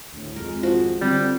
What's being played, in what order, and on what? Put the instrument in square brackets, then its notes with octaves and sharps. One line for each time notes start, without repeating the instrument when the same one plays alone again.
[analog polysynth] D2 A2
[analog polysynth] G#1 F2 G#3 [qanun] A#4
[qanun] F3 F#4
[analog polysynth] D3 C4 [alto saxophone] G3